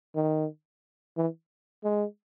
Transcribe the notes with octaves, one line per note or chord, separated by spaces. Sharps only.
D#3
E3
G#3